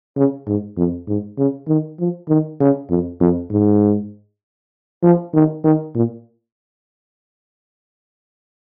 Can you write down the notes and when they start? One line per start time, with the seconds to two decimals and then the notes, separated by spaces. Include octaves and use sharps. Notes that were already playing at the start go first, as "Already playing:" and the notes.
0.16 C#3
0.47 G#2
0.77 F2
1.08 G#2
1.38 C#3
1.68 D#3
1.99 F3
2.29 D#3
2.60 C#3
2.90 F2
3.21 F2
3.51 G#2
5.03 F3
5.34 D#3
5.64 D#3
5.95 A#2